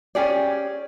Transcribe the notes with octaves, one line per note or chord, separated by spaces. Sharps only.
C#4 G4 G#4 D5